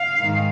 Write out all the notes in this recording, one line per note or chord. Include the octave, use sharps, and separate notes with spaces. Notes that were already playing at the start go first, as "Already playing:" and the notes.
Already playing: F5
G#2 D#3 G#3